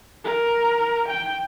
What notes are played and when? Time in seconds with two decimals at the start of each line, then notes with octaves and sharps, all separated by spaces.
0.24 A#4
1.09 G5